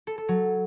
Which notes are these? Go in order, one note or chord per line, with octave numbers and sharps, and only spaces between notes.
A4
A4
F#3